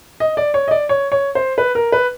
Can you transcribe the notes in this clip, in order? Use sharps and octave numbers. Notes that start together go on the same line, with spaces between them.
D#5
D5
C#5
D#5
D5
C#5
C#5
C5
B4
A#4
B4